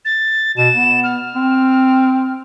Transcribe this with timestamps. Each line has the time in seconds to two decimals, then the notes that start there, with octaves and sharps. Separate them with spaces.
0.05 A6
0.58 B2 E7
0.74 B3
1.04 F6
1.35 C4